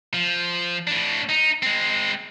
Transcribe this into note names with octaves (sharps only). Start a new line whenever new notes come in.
F3
A2 D4
D#4
G#3 C4